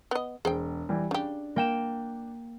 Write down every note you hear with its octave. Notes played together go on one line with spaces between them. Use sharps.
B3 D#5
E1 G#4 C5 G5
E3 G3
C#3 D4 G4
A#3 G5 E7